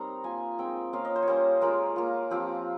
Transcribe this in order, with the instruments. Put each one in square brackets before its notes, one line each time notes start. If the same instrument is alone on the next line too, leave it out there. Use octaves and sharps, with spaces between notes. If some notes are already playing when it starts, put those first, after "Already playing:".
Already playing: [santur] G3 C4 D#4 A#4 A#5 C6
A#3 F4 G#5
G#3 C4 D#4 G5
A#3 C#4 F4 F5
D#5
C5
C#5
G3 A#3 C#4 C5
G#3 C#4 F4 A#4
A#3 F4
F3 C4 F4 G4